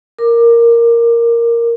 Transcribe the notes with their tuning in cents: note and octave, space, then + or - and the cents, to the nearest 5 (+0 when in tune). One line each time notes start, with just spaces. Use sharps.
A#4 +0 D6 +20